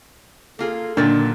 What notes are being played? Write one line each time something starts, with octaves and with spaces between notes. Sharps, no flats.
A#3 F4 G#4 A4
A#2 D3 D#3 F#3 D4 A6